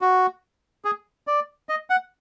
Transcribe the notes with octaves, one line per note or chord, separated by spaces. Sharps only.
F#4
G#4
D5
D#5
F#5